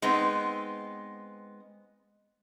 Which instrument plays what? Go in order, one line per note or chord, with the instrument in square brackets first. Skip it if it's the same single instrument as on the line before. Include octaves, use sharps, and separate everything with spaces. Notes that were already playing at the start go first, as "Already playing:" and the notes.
[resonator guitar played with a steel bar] G#3 B3 C4 D#4